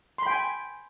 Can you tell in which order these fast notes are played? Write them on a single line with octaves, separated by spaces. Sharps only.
C6 B5 G5 G#5